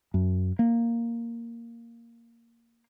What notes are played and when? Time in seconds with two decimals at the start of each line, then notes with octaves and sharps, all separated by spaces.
0.14 F#2
0.59 A#3